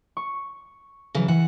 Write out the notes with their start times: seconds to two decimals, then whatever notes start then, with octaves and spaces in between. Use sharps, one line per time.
0.17 C#6
1.15 C#3 E3 F#3
1.28 E3 F#5